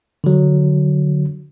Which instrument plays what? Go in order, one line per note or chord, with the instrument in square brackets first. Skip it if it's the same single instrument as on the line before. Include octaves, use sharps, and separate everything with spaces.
[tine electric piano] D3 F#3